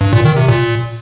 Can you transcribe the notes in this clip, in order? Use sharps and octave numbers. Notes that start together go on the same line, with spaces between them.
G2
A#2
D#3
C3
A#2